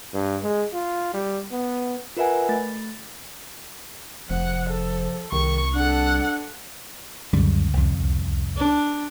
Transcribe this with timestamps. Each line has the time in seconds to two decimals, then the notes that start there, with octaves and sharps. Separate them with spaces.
0.13 G2
0.43 G#3
0.73 F4
1.14 G3
1.52 B3
2.17 F4 A#4 B4 E5 F#5 G#5
2.49 A3 A6
4.30 F1 F3 F#5
4.69 A4
5.32 C2 D#3 C#6
5.75 D4 A4 F#5
7.33 C#2 F#2 D3 G3 C#4
7.73 C2 F2
8.57 D4